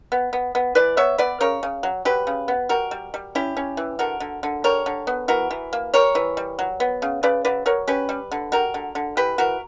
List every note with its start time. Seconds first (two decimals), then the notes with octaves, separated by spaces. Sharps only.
0.12 B3
0.33 B3
0.55 B3
0.75 E3 B4 D5
0.97 B3 C#5 E5
1.18 B3 B4 D5
1.40 C#3 A#4 C#5
1.63 C#3
1.83 F#3
2.05 F#3 G4 B4
2.27 C#3
2.48 B3
2.69 G3 F#4 A#4
2.91 G3
3.14 G3
3.35 C#4 E4 G4
3.57 C#4
3.77 E3
3.99 D3 F#4 A#4
4.20 D3
4.43 D3
4.64 G3 A#4 C#5
4.86 D3
5.07 B3
5.28 E3 F#4 A#4
5.51 E3
5.73 A#3
5.94 G3 A#4 C#5
6.15 E3
6.37 G3
6.59 F#3
6.80 B3
7.02 C#3
7.23 C#3 B4 D5
7.45 F#3 B4 D5
7.66 F#3 A#4 C#5
7.88 C#4 G4 B4
8.09 G3
8.32 D3
8.52 G3 F#4 A#4
8.74 D3
8.95 D3
9.17 E3 G4 B4
9.38 E3 F#4 A#4